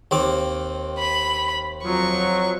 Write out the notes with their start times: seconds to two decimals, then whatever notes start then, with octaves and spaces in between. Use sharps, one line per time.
0.11 D#2 C4 D6
0.99 B5
1.85 F2 F3 F#3 C#6